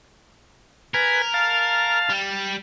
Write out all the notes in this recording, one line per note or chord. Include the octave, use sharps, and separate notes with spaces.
A#4 B4 G#5
F5 A5
G3